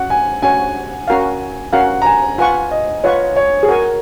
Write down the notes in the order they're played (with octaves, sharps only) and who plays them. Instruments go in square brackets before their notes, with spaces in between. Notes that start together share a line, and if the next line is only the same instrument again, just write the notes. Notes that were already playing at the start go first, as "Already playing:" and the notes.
Already playing: [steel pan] C#4 F#4 [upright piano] F#5
[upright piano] G#5
[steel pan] C#4 F#4 C#5 [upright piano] G#5
[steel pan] C#4 F#4 A#4 F5
[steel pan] C#4 F#4 A#4 F5 [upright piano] F#5
[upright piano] A#5
G#5
[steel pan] F4 B4 F#5 C#6 [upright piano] G#5
[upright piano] D#5
[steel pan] F4 B4 F#5 C#6 [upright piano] C#5
[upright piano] C#5
G#4
[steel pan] F#4 C#5 G#5 C#6 [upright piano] A#4